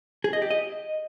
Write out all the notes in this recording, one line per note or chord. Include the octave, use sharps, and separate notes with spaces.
G#4
D#5
G4
D#5